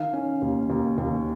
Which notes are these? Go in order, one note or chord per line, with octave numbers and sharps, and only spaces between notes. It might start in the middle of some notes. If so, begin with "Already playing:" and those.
Already playing: D#3 F5
C#4
D#2
D#2
D#2